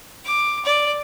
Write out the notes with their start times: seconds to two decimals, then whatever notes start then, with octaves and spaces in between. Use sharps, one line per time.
0.25 D6
0.65 D5